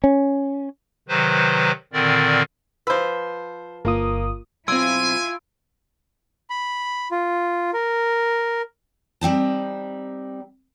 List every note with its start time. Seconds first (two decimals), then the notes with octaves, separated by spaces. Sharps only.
0.04 C#4
1.08 C3 D#3 F#3 B4 C5
1.93 A#2 D3 D#3 C4 A#4 D5
2.87 F3 B4 C5 E6
3.85 G1 A#3 F4 D#6
4.68 B1 C4 E4 F4 G#5 C6 E6 D7
6.50 B5
7.11 F4
7.73 A#4
9.21 G3 C4 D#4 A5